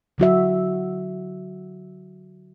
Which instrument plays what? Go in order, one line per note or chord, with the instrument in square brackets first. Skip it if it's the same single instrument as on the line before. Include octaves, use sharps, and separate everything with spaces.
[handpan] D3 F#3 F#4 E5